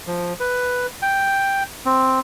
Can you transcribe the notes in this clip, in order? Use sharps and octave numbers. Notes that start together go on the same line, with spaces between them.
F3
B4
G5
C4